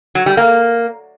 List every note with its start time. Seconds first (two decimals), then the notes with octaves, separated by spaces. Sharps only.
0.15 F#3
0.26 G3
0.37 A#3